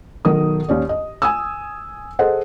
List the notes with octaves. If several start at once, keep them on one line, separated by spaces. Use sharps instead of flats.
B1 D#3 A#4 D#6
D#2 C#4 D5
D#5
G#5 D#6 E6
G#4 A4 C5 D#5 F#5